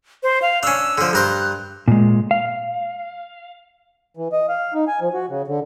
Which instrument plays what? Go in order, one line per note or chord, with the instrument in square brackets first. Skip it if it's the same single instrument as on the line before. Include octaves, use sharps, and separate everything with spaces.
[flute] C5
F5
[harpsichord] C#4 D4 [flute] E6
[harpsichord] D3 F3
[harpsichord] G2 A#4 C5 [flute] F#6
[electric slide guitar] A#2 G#3
F5
[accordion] E3
D#5
F5
D#4
G#5
F3
F#4
C#3
D3